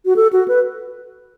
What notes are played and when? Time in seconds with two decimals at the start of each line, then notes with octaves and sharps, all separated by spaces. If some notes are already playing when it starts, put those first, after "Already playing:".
0.05 F#4
0.16 A4
0.33 F#4
0.48 B4